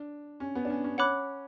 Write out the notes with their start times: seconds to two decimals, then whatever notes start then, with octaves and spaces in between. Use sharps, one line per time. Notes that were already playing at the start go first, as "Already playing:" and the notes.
Already playing: D4
0.40 C#4
0.55 B3
0.65 D4
0.70 C#4
0.84 C#4
0.98 C#5 F#5 B5 D6 F#6